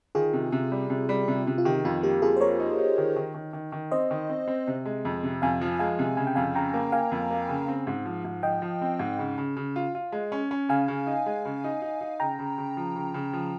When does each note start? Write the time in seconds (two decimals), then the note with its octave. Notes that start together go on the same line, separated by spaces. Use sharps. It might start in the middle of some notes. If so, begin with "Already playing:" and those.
0.15 D#3 F4 G#4
0.33 C3
0.52 C3
0.72 G3
0.90 C3
1.09 G3
1.28 C3
1.47 C3
1.58 F4
1.65 D#3 G4
1.85 F2 F4
2.03 A#3 G4
2.22 F2 F4 G#4
2.36 C5
2.40 A#3 A#4 C#5
2.60 D#4
2.78 D#4
2.98 D#3
3.16 D#3
3.35 D#3
3.53 D#3
3.72 D#3
3.91 C4 C5 D#5
4.11 D#3
4.30 C4
4.47 C4
4.67 C3
4.86 G#3
5.05 F2
5.23 C3
5.42 F2 F5 G#5
5.61 F3
5.79 G#3 F5 G#5
5.99 C3
6.17 C#3 G#5
6.27 G5
6.35 F2 F5 G#5
6.55 C#3 G5 A#5
6.74 A#3
6.92 A#3 F5 G#5
7.12 F2
7.31 A#3
7.49 C#3
7.68 C4
7.87 G#2
8.05 F3
8.25 G#2
8.43 F3 D#5 G5
8.62 F3
8.81 C4
8.99 G#2
9.19 C#3
9.38 C#3
9.56 C#3
9.76 F4
9.95 F4
10.12 G#3
10.32 C#4
10.51 C#4
10.69 C#3 F5 G#5
10.88 C#3
11.07 D#4
11.26 G#3
11.45 C#3
11.64 D#4
11.82 D#4
12.01 D#4
12.20 C#3 G5 A#5
12.39 C#3
12.58 C#3
12.77 F3
12.96 C#3
13.14 C#3
13.33 F3